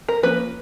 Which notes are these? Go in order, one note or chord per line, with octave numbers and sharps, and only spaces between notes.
A#4
F3 A#3 C#4 B4